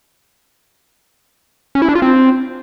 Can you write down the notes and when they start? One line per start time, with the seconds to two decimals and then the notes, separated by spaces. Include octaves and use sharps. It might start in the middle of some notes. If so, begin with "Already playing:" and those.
1.75 C#4
1.82 E4
1.89 D4
1.95 F4
2.02 C4